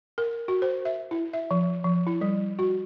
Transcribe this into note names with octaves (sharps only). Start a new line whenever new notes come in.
A#4
F#4
C5
E5
E4
E5
F3
F3
E4
G3
F#4